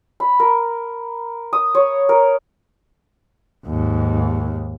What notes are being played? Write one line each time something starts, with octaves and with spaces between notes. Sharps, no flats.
B5
A#4
D#6
C#5
A#4
D#2 G#2